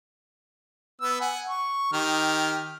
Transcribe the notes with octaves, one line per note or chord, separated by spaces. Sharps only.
B3 E6
F#5 G#5
C#6
D#3 G4 F6